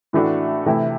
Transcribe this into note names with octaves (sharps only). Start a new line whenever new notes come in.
A2 E3 A3 D4 F#4
C3 E3 A3 E4